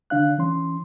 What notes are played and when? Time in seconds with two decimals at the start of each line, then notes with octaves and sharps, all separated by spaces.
0.10 D3 D4 F5 F#6
0.38 E3 C#4 C6